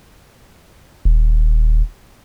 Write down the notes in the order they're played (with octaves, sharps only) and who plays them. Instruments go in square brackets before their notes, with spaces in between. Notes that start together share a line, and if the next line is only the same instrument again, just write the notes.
[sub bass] D#1